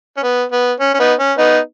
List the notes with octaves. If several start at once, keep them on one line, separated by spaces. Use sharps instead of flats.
C#4
B3
B3
C#4
C#4
B3 D#4
C#4
B3 D#4